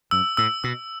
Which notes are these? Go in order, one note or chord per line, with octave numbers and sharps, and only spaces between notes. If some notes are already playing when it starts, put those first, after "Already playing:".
F#2 E6
A2 E6
B2 E6